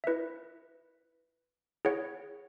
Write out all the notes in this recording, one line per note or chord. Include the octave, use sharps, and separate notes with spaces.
E4 B4 E5
E4 G#4 C#5 F#5